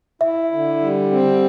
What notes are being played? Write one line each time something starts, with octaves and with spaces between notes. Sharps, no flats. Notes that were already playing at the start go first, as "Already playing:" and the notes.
E4 E5
D3
G3
C4